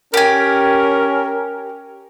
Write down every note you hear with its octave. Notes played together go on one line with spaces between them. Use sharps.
C#4 G4 A#4 G#5